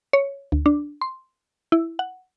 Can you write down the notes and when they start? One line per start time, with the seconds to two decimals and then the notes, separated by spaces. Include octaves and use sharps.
0.13 C#5
0.52 D2
0.66 D4
1.01 C6
1.72 E4
1.99 F#5